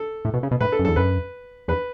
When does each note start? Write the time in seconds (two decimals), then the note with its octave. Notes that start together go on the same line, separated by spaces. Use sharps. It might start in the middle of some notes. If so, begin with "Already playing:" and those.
Already playing: A4
0.25 A2
0.34 B2
0.43 C#3
0.51 B2
0.61 A2 B4
0.72 A4
0.79 F#2
0.85 E2 A4
0.96 F#2 B4
1.68 E2 B4